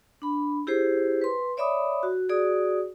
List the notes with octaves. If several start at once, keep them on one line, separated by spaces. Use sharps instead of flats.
D4 B5
E4 G4 G#4 C5
B4 C6
C#5 D5 E5 B5 D6 D#6
F#4
F#4 G#4 D5 D#6